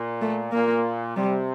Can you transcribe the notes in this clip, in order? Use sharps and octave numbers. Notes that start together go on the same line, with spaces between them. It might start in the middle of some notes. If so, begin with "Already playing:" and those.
Already playing: A#2
A3
A#2 A#3
C3 G3